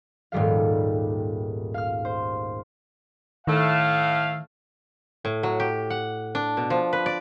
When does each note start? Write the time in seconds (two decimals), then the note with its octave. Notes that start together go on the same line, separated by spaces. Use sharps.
0.32 D#1 G#2 G3 A3 F5
1.74 F5 F6
2.05 C5
3.47 A2 D#3 A3 F5
5.25 A2
5.43 F#3
5.60 G4
5.90 F#5
6.35 D4
6.57 B2
6.70 F3
6.93 B4
7.06 D5